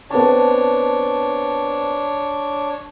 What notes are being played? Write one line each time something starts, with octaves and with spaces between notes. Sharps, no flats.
B3 C4 D4 C#5 A5